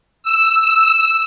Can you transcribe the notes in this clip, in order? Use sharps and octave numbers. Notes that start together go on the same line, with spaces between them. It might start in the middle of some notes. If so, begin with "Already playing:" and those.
E6